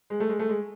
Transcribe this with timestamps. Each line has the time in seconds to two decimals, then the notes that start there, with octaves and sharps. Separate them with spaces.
0.10 G#3
0.20 A3
0.29 G#3
0.39 A3
0.49 G#3